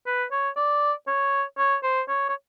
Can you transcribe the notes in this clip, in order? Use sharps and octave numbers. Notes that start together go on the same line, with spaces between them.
B4
C#5
D5
C#5
C#5
C5
C#5
C#5